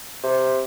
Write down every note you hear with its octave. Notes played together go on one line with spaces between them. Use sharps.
C3